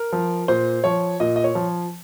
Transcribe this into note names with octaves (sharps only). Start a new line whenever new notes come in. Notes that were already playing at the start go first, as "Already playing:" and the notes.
Already playing: A#4
F3
A#2 C5
F3 C#5
A#2 D#5
D#5
C#5
F3